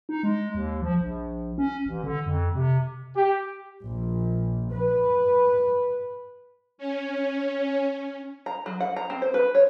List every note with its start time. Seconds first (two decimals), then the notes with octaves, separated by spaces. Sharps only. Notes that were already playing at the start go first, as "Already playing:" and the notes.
0.09 D#4
0.23 G#3
0.55 D#2
0.82 F3
1.01 A#1
1.58 C#4
1.86 A1
2.04 D3
2.26 F2
2.55 C3
3.16 G4
3.84 A#1
4.71 B4
6.78 C#4
8.46 A#5
8.66 F#3
8.80 F#5
8.96 A#5
9.10 C4
9.22 C5
9.34 B4
9.55 C#5